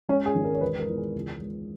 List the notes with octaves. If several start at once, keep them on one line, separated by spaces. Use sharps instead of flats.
G#3 C#4
G#4
G#1
A#4
C#5
E1 B4
A#4
E2
G#4
C#2
G#3